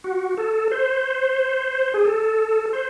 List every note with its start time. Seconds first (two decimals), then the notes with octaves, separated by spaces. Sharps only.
0.04 F#4
0.37 A4
0.71 C5
1.94 G#4
2.05 A4
2.73 C5